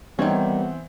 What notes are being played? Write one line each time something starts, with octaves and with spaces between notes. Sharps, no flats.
D#3 E3 G3 B3 C4 C#5